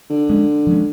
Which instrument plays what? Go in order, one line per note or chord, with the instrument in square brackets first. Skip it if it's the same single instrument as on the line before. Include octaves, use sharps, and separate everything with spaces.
[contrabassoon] D3
[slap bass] F3 G#3 C#4
F3 G#3 C#4